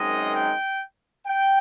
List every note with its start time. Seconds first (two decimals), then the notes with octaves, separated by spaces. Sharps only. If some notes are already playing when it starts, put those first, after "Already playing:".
Already playing: F#2 D#3 G#3 C4 D#4 D#5
0.34 G5
1.27 G5